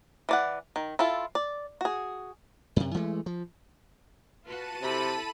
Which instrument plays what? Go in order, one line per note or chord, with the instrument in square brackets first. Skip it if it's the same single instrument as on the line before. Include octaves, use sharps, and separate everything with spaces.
[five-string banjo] E3 D5 F#5
D#3
E4 F4 A4
D5
F#4 G#4
[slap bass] F#2 C3
E3 G#3 A3
F3
[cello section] F4 F#4 B4 [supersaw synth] A5 D#7
[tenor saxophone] C3 [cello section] E4 A4 [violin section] B5